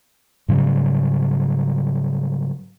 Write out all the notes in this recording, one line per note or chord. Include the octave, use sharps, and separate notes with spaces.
G#2 C#3 F#3 G3